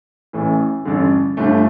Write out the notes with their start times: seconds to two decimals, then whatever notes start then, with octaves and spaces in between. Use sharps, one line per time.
0.33 A1 A2 E3
0.85 A1 G2 D3
1.37 G1 G2 D3 A3